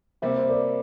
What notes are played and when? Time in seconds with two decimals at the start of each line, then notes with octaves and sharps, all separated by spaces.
0.22 C3 G3 A#3 C5 E5
0.38 C5
0.49 A#4 D5